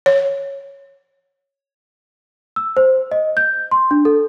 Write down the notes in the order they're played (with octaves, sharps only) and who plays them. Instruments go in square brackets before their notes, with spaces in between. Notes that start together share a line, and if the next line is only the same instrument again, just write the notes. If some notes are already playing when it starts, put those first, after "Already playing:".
[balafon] C#5
[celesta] E6
C5
D#5
G6
C6
D4
A4